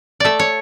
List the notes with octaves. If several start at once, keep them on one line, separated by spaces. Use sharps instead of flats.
A3 D5 E5
C#5